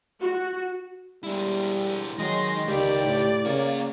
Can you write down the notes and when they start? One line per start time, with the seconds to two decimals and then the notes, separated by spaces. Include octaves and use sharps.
0.20 F#4
1.24 G3 G#3 E4
2.19 D#3 F#3 G#3 C6 A#6
2.68 C#2 D#3 G4 D5
3.05 A2
3.45 C#3 A#3 F4 C#5